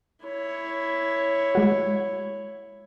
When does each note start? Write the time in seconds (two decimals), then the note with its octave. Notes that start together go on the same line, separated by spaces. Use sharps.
0.25 E4 C#5
1.55 G#3 F#4